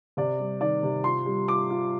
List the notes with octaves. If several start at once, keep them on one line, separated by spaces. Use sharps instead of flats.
C3 D5
G3
D#3 D5
C3
F4 C6
G3
F4 D6
F4